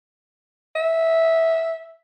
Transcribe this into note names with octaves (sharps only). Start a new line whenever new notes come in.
E5